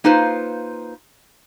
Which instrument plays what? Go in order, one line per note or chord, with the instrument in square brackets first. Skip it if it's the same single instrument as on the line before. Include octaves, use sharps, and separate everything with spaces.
[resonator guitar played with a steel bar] A#3 D#4 F4 B4 C5